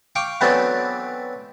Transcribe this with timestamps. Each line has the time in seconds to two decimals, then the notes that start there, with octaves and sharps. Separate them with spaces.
0.16 F5 G5 C#6 D6
0.41 E3 F#3 A3 B3 C4 D4